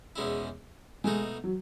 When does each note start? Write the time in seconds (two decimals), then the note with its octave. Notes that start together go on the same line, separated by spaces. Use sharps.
0.16 E2 B2 G#3 C#4 E4
1.04 B2 G#3 A3 D#4 F#4
1.44 F#3